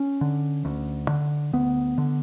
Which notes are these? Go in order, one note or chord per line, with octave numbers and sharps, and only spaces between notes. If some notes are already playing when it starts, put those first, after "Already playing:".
Already playing: C#4
D3
D2
D3
D2 B3
D3